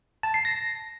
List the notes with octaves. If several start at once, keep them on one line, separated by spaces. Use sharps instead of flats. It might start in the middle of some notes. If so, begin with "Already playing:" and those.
A5
C7
A#6